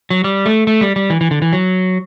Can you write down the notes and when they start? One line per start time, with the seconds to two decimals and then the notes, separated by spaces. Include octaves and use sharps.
0.10 F#3
0.24 G3
0.46 A3
0.67 A3
0.81 G3
0.96 G3
1.10 E3
1.21 E3
1.31 D3
1.42 E3
1.53 F#3